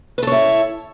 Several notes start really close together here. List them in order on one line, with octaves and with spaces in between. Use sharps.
B4 A4 C#5 E4